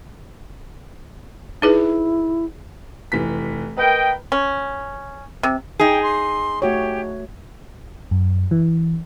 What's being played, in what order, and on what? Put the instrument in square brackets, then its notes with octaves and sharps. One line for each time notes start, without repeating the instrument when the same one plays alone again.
[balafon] D#4 G#4 B4 [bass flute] E4
[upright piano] F1 E3 B6
[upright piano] A#4 B4 [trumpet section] D#5 G5
[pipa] C#4
C3
[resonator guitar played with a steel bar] D#4 G#4 [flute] G5
[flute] C6
[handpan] A3 F#4 C#5 [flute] G4
[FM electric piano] F#2
E3